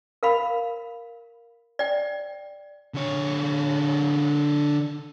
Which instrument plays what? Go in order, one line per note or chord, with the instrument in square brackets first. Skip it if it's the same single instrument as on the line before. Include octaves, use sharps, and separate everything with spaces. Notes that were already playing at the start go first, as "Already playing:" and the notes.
[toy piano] A#4 F5 B5
D5 G5
[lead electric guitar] D3 C#5